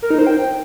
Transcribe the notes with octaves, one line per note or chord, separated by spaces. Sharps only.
A#4
D#4
C5
G5